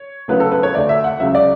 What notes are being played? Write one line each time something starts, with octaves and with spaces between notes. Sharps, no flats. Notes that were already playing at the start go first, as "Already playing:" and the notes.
Already playing: C#5
D2 C#3 F#3 B3 B4
A4
B4
C#5
D2 D3 A3 D5
E5
F#5
C#2 C#3 F#3 E5
D5